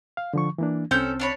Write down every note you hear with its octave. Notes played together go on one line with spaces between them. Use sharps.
F5
D3 F3 C#6
E3 A#3 D4
C2 C4 C#4 A4 G6
D4 C#5 B5